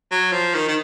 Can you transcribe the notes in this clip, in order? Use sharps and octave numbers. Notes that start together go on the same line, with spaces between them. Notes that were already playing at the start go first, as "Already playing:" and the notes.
F#3
F3
D#3
D#3